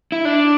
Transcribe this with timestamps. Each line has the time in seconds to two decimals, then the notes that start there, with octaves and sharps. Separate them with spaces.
0.12 E4
0.25 D4